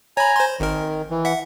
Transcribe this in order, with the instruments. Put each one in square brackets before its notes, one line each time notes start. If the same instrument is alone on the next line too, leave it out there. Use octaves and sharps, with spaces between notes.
[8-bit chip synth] C#5 B5 [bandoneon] G#5 A#5
[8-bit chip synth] C5 C6
[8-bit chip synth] G#1 A#4 [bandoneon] D#3
[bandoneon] E3
[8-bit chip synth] E5 F#5